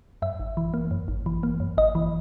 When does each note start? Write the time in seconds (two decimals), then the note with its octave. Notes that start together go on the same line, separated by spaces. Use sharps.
0.22 F#2 E5
0.40 G#1
0.57 E3
0.74 A#3
0.91 F#2
1.08 G#1
1.26 E3
1.43 A#3
1.60 F#2
1.77 G#1 D#5
1.95 E3